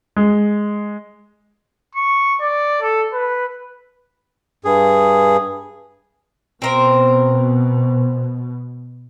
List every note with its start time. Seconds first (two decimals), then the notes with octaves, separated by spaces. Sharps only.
0.16 G#3
1.95 C#6
2.41 D5
2.82 A4
3.13 B4
4.65 G2 G#4
6.62 B2 C4 A#4 C5